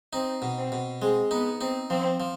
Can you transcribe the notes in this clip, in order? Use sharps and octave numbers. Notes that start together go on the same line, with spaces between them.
C4 D#4
B2
C4
B2
G#3 C4
B3 D#4
C4 D#4
F3 C4
F3